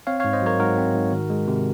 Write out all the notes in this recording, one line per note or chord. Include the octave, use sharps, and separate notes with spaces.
C4 C#5 F5
G#2 C#5 F5
C5 D#5
F#3 A#4 C#5
G#2 F#4 A#4
C4
G#2
D#3
G#3
C3